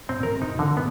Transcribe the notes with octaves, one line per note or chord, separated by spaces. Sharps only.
C4
A#4
D#4
D3
B3